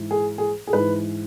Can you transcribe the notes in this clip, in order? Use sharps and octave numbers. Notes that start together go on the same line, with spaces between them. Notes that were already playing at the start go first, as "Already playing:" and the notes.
Already playing: G#2 E3
G#4
G#4
G#4
G#2 E3 B4